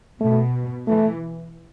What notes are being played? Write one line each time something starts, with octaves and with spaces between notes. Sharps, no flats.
B2 A3
E3 A3